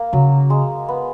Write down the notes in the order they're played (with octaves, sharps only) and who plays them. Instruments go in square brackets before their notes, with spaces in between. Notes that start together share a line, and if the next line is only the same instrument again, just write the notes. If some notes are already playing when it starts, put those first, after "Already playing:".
Already playing: [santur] A#3
[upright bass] C#3 [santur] F#3
[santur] G#3
B3